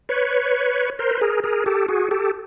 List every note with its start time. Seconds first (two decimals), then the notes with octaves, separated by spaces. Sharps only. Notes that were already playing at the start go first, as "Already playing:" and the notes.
0.09 B4 C#5
0.99 A#4 C5
1.11 B4
1.21 G#4 A#4
1.44 G#4 A#4
1.66 G4 A4
1.88 F#4 G#4
2.11 G4 A4